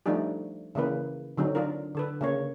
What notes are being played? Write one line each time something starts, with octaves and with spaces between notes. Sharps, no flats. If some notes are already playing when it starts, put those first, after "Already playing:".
F3 G3 A3 D4 D#4 G4
C#3 E3 A#3 B4
D3 F#3 C4 D#4
D4 F4 A#4
D3 A4 B4
C#3 A#3 C#5